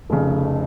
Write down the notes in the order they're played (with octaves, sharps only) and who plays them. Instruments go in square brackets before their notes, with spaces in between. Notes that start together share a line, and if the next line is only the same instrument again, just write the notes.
[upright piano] F1 F2 C#3